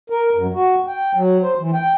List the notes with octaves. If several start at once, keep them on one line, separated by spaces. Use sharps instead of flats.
A#4
F#2
F#4
G5
F#3
C5
E3
G5